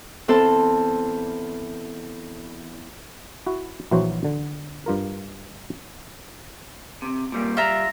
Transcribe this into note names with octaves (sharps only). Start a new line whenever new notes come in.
E2 C4 A4 C5 A5
E4 F#4
A#1 E3 F#3 F#4 C5
D3
G2 F4 A#4
C3
A#2 G3 A#3
G3 F4 E5 A#5